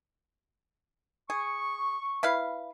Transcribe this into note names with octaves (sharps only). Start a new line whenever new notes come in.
G#4 C#6
E4 B4 F5